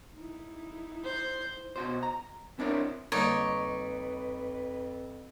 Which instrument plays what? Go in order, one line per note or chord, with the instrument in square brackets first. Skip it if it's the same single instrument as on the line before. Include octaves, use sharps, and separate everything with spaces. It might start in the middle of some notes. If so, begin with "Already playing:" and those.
[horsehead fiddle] D#4 E4
[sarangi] C5
[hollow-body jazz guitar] B2 F#4 C5
A#5
C4 D4 E4 A#4 C#5
[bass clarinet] F2 [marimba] D3 G3 A#3 [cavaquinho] D#4 C#5 D5 [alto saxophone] B4